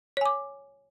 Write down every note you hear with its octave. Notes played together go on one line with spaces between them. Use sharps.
C#5 G#5 D6